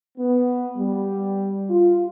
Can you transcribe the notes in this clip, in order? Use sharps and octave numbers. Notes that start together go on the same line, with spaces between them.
B3
G3
F4